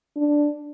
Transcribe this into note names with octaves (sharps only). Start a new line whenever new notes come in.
D4